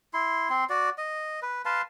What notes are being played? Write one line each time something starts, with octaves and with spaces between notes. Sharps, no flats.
E4 C6
C4 C6
F#4 D5
D#5
B4
B4 F5 A5 C6